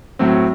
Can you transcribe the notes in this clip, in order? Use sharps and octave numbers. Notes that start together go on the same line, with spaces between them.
A2 F#3 A3 C4